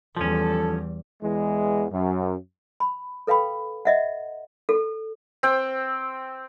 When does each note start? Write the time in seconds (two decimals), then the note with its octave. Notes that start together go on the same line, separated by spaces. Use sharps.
0.17 E2 F3 G3 C#4 A4
1.21 E2 E3 G#3
1.90 F#2
2.80 B5
3.27 A4 B4 F5 G5 B5
3.85 D#5 E5 F#5
4.69 A4
5.43 C4 G5